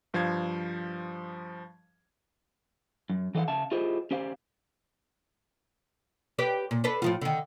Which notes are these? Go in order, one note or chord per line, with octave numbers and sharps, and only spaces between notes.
G2 F3 C5 F5 G#6
F#2
E3 A4 B4 D#5 F5 F#5
C#3 E5 F5 A5
E4 F4 G4 G#4 C5 D#5
C#4 G4 C5 F5
G4 B4 D5
A#2
D4 A4 B4
A2 F3 F4
D3 D#3